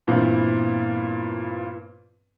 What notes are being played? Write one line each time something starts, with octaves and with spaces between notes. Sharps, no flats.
G2 A#2 E3 B3 C4